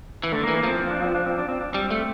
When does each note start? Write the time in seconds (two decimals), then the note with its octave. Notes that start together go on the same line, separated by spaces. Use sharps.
0.23 E3
0.32 D3 A3
0.43 A#3
0.47 E3
0.56 A#3
0.63 F3 C4
0.79 C4
0.90 D4
1.02 C4
1.15 D4
1.26 C4
1.38 D4
1.49 C4
1.61 D4
1.73 G3 C4
1.91 A3